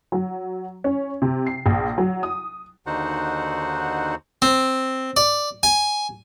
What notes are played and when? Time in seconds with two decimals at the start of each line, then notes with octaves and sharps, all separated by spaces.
0.12 F#3
0.84 C#4
1.22 C3
1.47 C7
1.66 A#1
1.98 F#3
2.23 D#6
2.86 D#2 D3 D#4 F#4 C5 F#5
4.42 C4
5.17 D5
5.63 G#5